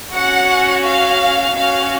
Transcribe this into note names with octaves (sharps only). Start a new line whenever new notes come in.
C#4 F#4 F#5
F5
C#4 F#4 F5